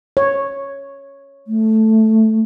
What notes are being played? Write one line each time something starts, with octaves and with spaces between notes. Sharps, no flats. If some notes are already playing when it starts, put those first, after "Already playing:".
C#5
A3